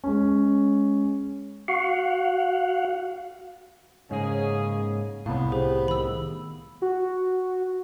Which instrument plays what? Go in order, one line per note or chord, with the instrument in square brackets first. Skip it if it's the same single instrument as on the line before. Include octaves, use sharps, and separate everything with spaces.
[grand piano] G#3 C#4
[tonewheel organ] F#4 F5 F#5
[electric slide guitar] G#2 A#3 [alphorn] C#3 [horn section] C#4 G#4
[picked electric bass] C2 A2 [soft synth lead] C3 [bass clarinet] B3 [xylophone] F5
[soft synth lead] G4 [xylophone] G#4 C5
[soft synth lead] D#3 [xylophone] B5 E6
[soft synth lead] F#4